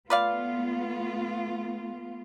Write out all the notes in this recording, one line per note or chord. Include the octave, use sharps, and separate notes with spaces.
A3 B3 F4 B4 D5 F5